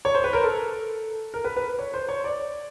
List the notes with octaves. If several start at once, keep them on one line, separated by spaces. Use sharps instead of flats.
C#5
C5
B4
A#4
A4
A#4
B4
B4
C#5
C5
C#5
D5